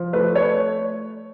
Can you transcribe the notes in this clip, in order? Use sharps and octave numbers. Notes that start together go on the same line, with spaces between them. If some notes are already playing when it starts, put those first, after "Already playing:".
Already playing: F3
A3 B4
C#5